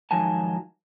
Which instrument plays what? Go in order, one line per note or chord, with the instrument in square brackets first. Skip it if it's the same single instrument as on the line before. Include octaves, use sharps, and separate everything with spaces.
[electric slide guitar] G#2 D#3 F3 F#3 G#5 A5